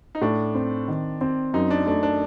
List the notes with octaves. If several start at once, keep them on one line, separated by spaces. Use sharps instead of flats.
D#4
A2 D4
C4
D#3
C4
F#2 D#4
D4
A3 D4
D4